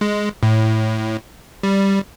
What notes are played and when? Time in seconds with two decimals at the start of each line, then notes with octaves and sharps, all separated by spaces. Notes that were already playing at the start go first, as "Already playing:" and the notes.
0.01 G#3
0.43 A2
1.63 G3